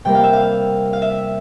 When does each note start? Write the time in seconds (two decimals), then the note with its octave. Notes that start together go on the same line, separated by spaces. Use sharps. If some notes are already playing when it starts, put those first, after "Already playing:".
0.05 C3 G3 A#3 G5
0.15 F5
0.24 E5
0.33 F5
0.93 F5
1.02 E5